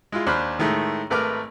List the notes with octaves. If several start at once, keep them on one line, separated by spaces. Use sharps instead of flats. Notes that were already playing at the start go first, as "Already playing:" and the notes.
G#3 E4 F4
D#2 D4 C5 B5 F6 F#6
A2 D#3 G#3 A3
G#1 A3 A#4 B4 D6 F6